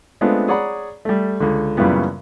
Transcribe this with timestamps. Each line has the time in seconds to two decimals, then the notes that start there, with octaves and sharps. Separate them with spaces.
0.21 G#3 A3 B3 C4 D4 F4
0.48 G#4 C#5 D5 F#5 A#5 B5
1.05 G3 A3
1.40 C#2 D3
1.77 F#2 A#2 C#3 E3 G3 B3